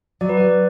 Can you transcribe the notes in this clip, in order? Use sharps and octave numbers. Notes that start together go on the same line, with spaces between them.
F#3 D5
B4
F#3 D5